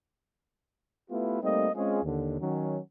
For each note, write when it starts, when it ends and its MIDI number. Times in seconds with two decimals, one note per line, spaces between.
1.10 1.40 57
1.10 1.40 59
1.10 1.40 64
1.10 1.40 65
1.10 1.40 67
1.10 1.40 71
1.42 1.67 55
1.42 1.67 57
1.42 1.67 58
1.42 1.67 60
1.42 1.67 63
1.42 1.67 75
1.74 2.03 56
1.74 2.03 60
1.74 2.03 61
1.74 2.03 65
1.74 2.03 68
2.03 2.39 39
2.03 2.39 50
2.03 2.39 51
2.40 2.77 51
2.40 2.77 54
2.40 2.77 61